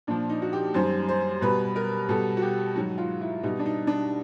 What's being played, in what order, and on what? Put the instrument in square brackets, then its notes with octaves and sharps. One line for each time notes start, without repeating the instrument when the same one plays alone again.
[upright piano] A#2 F3 D4
D#4
F#4
G4
F#2 D#3 G3 C5
C5
B2 G3 B4
A#4
B2 G3 A4
F#4
G4
G#2 D#3 F#3 F#4
F4
E4
B2 G3 D#4
D4
D#4
D4